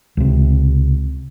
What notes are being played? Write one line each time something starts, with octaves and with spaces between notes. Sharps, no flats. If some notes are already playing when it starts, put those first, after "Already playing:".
C#2 C3